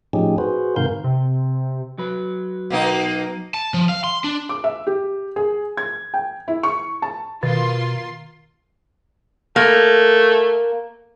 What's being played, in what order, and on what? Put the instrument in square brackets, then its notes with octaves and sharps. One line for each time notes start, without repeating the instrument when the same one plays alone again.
[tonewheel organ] A2 F3 C#4 D#4 G4 G#4
F#4 G#4 B4 C5
G#2 C3 D#3 A#4 F5 G6
[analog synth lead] C3
[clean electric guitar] F#3 B4
[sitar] B2 A#3 D#4
[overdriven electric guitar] A5
F3
F5
C6
D4
[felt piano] D6
E5
G4
G#4
G#6
G5
E4
C#6
A5
[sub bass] B2 [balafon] D#3 [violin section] A#3 F4 C6
[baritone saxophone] A3 [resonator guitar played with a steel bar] A#3